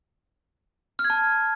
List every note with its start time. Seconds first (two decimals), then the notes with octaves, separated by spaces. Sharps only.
0.99 F6
1.04 G#6
1.10 A5